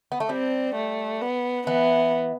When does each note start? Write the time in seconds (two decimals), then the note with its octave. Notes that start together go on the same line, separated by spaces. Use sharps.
0.12 B3
0.20 A3
0.29 G3 C4
0.75 A3
1.21 B3
1.67 E3 B3